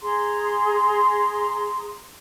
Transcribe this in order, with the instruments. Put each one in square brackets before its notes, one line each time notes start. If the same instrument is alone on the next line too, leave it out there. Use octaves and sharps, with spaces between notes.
[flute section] G#4 A#5 C6